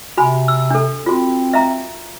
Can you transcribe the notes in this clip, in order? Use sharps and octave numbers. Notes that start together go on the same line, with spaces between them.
C3 F#4 G#5 B5
E6
D4 A4
C4 F4 F#4
E5 F5 A#5